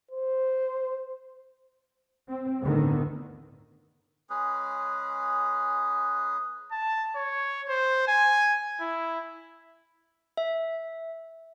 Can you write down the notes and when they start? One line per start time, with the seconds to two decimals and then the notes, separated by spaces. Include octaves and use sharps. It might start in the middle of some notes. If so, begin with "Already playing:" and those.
0.11 C5
2.29 C4
2.62 G1 D2 A2 D3 D#3 B3
4.30 G#3 C#4 G#4 B4
6.72 A5
7.16 C#5
7.69 C5
8.08 G#5
8.81 E4
10.37 E5